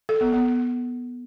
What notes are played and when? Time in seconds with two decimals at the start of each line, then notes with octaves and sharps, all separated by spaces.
0.09 A4
0.21 B3
0.32 B3